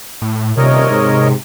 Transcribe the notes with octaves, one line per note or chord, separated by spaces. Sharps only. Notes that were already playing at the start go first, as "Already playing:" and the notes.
A2
D#1 C3 A#4 C#5 D#5
G#2